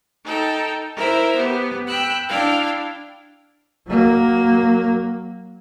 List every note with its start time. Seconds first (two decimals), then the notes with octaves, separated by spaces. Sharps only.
0.24 D#4 A4 G5
0.96 E4 A#4 C5 E5
1.36 B3 G4
1.88 G5 B5 E6 F#6
2.29 D4 E4 F5 G5
3.87 F#3 A#3